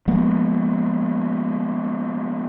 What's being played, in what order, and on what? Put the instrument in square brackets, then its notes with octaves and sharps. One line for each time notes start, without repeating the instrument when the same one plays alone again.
[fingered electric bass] F3 G#3 A#3 B3